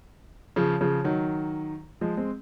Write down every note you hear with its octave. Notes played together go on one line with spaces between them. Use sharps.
C#3 F3
C#3 F3
D#3 F#3
F3 G#3
G#3 C4